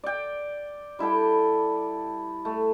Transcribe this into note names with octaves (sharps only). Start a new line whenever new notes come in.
D5 G5
G3 E4 A4 G5
A3